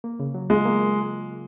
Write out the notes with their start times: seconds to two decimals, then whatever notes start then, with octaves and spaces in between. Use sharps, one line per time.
0.04 A#3
0.20 C#3
0.34 F#3
0.50 G#3 F4
0.65 A#3